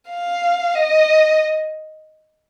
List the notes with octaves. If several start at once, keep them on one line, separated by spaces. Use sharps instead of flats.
F5
D#5